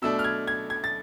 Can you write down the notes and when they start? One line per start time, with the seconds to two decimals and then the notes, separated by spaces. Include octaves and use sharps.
0.02 B2 A3 D4 E6
0.19 F6
0.24 G#6
0.47 G#6
0.70 G#6
0.84 A6